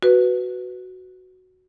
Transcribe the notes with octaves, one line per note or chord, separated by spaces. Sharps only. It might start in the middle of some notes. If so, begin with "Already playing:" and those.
F#4 B4